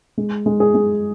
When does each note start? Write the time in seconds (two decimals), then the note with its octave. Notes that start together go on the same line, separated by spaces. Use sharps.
0.18 G#3
0.46 G#3
0.60 G#4
0.74 G#3